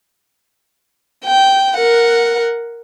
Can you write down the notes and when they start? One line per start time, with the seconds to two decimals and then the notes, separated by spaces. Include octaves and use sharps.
1.25 G5
1.77 A#4 F#5